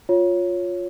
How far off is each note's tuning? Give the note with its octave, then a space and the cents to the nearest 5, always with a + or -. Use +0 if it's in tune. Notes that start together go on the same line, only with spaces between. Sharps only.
F4 +10 C#5 +0